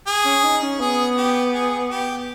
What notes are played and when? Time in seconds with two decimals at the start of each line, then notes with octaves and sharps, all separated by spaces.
0.07 G#4
0.25 C#4
0.44 D#4
0.62 C#4
0.80 B3 G#4
1.17 G4
1.54 G#4
1.90 G4